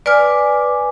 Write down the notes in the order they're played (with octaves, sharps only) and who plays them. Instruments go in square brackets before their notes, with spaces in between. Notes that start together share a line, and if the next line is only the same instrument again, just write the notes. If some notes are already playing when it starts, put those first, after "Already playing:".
[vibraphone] B4 G#5 D6 [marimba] D5 F6